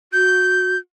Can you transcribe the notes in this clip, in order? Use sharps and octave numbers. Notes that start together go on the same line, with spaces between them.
F#4 G6